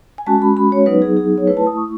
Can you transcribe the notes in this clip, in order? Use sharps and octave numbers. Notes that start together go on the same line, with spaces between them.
G#5
G#3 C#4 F#4 A5
B5
B5
C#5
F#3 B3 D#4 B4
G#4
G#4
C#5
A3 E4 B4
A5
D#6
C#6